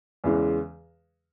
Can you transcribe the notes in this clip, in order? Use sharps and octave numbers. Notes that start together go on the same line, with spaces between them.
E2 C#3 E3 G#3